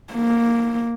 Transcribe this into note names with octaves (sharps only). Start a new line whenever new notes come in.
A#3